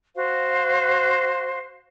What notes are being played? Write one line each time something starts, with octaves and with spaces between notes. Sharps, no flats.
F#4 C5 F5